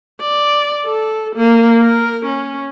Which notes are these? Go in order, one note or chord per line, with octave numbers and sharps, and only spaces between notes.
D5
A4
A#3
A#4
C#4